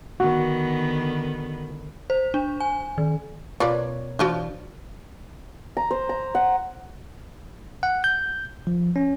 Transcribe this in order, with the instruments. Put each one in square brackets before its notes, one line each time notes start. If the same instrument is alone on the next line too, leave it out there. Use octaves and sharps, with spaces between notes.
[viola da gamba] D3 D#3 B3 [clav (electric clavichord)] F#4
[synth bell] C5
D4
G#5
D#3
[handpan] B2 A#4 C#5 [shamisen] F4 B4 D5
[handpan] E3 D4 [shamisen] F3 F4 F#4
[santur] A#5
C5
A#5
F#5
[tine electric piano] F#5
G6
F3
C#4